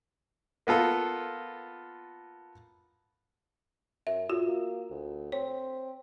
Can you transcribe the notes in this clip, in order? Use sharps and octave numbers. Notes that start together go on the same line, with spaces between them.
A#3 B3 F4 A4
F#2 E5
A2 F4 F#4
A#3
D2
C4 C#5